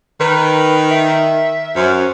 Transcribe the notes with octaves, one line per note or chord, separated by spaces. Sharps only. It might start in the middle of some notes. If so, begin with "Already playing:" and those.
D#3 B4
E5
F#2 C5